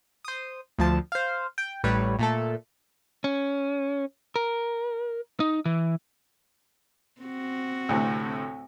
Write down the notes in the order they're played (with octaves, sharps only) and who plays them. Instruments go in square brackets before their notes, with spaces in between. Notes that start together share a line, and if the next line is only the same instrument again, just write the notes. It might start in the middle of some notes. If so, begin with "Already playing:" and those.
[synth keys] C5 D#6
D2 F3 A5
C5 F5
G5
A1 G3 B4 C#5
A#2 A3 A4
[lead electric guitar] C#4
A#4
D#4
E3
[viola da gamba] C4 F#4
[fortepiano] D2 A2 C3